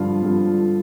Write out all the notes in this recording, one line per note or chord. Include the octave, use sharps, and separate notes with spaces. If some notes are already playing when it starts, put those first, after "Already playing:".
Already playing: G2 D3 F3 F4
G2 D3 F3